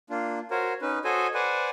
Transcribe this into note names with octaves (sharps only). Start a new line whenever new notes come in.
A#3 D4 F4
F#4 A#4 C5 C#5
C#4 D#4 B4
F#4 A4 C5 C#5 D#5 G#5
B4 C5 D5 F#5 G#5